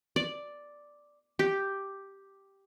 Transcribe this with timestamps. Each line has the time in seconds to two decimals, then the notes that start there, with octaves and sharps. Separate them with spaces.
0.16 D5
1.39 G4